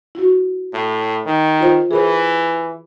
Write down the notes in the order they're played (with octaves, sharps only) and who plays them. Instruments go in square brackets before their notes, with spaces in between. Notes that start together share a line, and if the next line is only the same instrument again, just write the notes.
[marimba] E4 F#4
[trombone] A2
D#3
[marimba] F4 C5
[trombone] E3 [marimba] G#4 A#4 C5